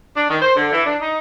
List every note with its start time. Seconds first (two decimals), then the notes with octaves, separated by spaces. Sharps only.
0.15 D4
0.29 D#3
0.42 C5
0.56 D3
0.73 E3
0.85 D4
1.01 D#4